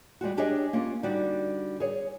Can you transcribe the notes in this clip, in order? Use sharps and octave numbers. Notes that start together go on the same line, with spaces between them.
G3 G#3 F4 F#4
D4 G4 G#4 C#5 D#5
A#3 C#4 F4
D3 G3 D#4 F#4 D5
G#4 C#5